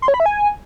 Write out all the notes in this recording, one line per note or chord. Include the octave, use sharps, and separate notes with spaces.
C6
C#5
B5
E5
G#5